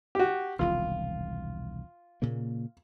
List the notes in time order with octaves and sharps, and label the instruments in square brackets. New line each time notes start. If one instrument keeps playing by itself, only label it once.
[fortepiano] F#4 G4
[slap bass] E1 C2 D#3 [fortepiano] F4
[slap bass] A#2 C#3 A#3